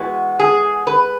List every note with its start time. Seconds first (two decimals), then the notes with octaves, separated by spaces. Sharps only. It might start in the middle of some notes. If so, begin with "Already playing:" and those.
Already playing: E3 G#3 B3 F#4
0.39 G#4
0.87 B4